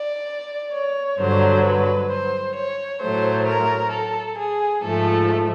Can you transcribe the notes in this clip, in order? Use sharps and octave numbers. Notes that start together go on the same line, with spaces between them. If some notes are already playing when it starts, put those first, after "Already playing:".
Already playing: D5
C#5
G2 D3 F#3 C5
B4
C5
C#5
A2 F#3 A3 C5
A#4
A4
G#4
G#2 F3 A3 A4